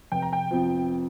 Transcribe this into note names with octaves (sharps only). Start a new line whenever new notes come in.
F1 G5
A#5
G5
F2 F3